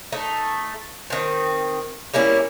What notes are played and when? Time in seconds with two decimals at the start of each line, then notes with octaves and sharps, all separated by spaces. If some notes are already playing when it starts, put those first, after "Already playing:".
0.12 A3 D#4
1.10 D#3 C4
2.14 G3 A#3 C#4 E4